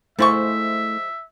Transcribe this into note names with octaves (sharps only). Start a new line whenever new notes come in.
F3 G#3 A3 E4 C5 E5 C#6